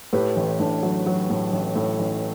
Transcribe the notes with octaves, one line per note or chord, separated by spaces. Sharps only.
A2 G4 B4
A1
A2 D4
F#3
F#3
A2
A1
A2
A1